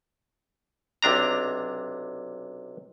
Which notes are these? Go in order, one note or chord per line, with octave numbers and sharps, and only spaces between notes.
B1 C3 D4 A#5